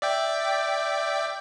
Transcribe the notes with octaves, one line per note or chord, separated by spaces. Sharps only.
D5 E5 G5